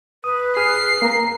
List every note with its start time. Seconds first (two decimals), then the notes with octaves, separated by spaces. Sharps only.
0.24 B4 D#6
0.57 G#4 D#6 F6 C7
1.02 A#3 A#4 A#5